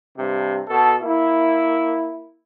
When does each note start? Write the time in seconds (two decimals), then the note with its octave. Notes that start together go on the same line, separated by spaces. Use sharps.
0.16 G2 C3
0.69 B2 A4
1.02 A#3 E4